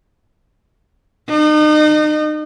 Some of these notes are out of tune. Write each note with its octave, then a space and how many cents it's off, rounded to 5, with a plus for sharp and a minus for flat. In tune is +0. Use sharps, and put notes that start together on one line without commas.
D#4 -35